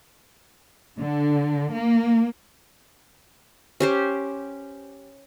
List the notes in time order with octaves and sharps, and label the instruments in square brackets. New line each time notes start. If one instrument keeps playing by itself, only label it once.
[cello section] D3
A#3
[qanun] C#4 G4 C5